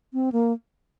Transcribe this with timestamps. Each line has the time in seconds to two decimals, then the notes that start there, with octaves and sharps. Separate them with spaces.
0.13 C4
0.32 A#3